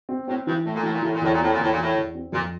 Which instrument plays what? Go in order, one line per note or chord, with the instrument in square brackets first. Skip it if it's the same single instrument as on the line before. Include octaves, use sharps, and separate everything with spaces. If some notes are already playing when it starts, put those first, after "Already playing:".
[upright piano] C4
[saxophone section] A2 [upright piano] C4
[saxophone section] G2 [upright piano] E3
[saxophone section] A2 [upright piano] A3
[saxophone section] A#2
[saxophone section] A2 [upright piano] E3
[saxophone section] A#2
[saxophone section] A2 [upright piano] E3
[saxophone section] A#2
[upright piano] E2 [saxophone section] A2
[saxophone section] A#2
[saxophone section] A2 [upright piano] C4
[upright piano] E2 [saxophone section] A#2
[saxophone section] A2
A#2
[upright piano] E3
[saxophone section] A2
[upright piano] E2
C4
[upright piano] F2 [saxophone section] A#2